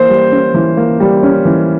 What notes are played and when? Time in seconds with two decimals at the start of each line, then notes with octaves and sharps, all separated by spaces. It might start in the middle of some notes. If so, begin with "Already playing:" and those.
Already playing: E3 A#3 C5
0.09 G3
0.32 C#4
0.54 E3
0.77 A#3
1.00 G3
1.23 C#4
1.45 E3